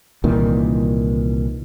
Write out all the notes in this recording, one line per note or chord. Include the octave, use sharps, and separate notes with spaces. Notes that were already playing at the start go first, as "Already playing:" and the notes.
C2 A#2 D#3 E3